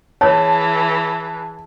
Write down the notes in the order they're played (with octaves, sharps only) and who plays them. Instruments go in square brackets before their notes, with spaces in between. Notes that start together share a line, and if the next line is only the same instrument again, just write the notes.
[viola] E3 G#4 [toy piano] C#5 [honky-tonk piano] A5